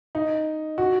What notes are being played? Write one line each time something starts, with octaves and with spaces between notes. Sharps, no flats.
D#4
F#4